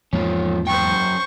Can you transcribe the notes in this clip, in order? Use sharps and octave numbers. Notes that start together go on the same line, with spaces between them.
E2 G#2 F3 A#3 C#4
F#2 C5 G5 C#6